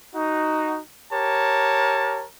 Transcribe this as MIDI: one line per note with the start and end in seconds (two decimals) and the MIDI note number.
0.15 0.80 63
0.15 0.80 66
1.12 2.25 67
1.12 2.25 70
1.12 2.25 73
1.12 2.25 81